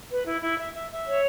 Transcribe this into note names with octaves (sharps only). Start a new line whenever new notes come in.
B4
E4
E4
E5
E5
E5
C#5